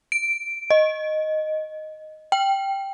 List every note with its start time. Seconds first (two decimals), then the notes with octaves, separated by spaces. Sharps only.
0.12 D7
0.70 D#5
2.32 G5